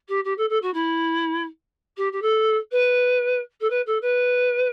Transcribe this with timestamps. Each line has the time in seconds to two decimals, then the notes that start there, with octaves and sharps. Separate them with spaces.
0.08 G4
0.24 G4
0.37 A4
0.49 A4
0.62 F#4
0.73 E4
1.97 G4
2.12 G4
2.21 A4
2.71 B4
3.60 A4
3.70 B4
3.86 A4
4.02 B4